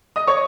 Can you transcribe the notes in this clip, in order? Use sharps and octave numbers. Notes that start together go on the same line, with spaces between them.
D#5 D#6
C#5 C#6